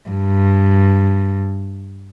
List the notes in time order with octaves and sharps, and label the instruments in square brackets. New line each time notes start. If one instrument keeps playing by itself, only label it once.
[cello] G2